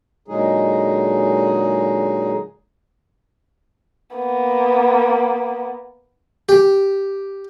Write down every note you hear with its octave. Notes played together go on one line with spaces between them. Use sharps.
A#2 D3 F#3 G#3 D#4 G#4
A#3 B3
G4